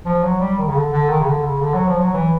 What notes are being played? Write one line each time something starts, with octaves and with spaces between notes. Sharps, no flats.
F3
F#3
G3
D#3
C#3
D3
D3
D#3
C#3
D3
C#3
D3
F#3
F3
F#3
E3